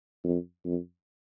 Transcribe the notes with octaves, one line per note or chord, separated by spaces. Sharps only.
F2
F2